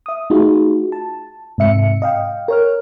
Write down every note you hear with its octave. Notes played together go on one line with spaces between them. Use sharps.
E5 D#6
A3 D#4 F4 F#4 G#4
A5
G#2 C3 E5 C#7
D#5 F5 G5
A#4 C#5 F6